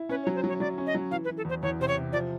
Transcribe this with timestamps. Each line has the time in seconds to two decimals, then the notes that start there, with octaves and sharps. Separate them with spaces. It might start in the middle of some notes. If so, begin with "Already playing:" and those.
Already playing: E4
0.09 C#4 B4
0.23 C#5
0.27 F#3
0.35 C5
0.44 F#3 C#5
0.60 F#3 D5
0.78 C#4
0.87 D#5
0.95 F#3
1.11 E3 F5
1.25 B4
1.28 E3
1.37 A4
1.45 E2 C5
1.62 E2 C#5
1.80 C3 C5
1.88 C#5
1.96 C3
2.13 F3 D5